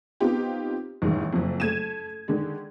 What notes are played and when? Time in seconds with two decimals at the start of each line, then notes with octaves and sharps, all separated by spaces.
0.20 B3 C4 D#4 F4 G4
1.02 A1 G2 D#3 G#3
1.33 F#1 F2
1.60 A3 G#6 D#7 E7
2.28 D3 D#3 G#3